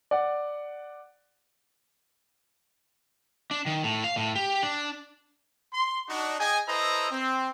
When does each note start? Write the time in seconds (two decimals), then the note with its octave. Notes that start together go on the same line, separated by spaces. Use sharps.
0.11 D5 F#5
3.51 D4
3.66 D#3
3.84 A2
4.04 F5
4.17 A2
4.35 G4
4.63 D4
5.73 C6
6.09 D4 D#4 F#4
6.40 G#4 D#5 G5 G#5
6.68 E4 A4 B4 C5 D#5 A#5
7.11 C4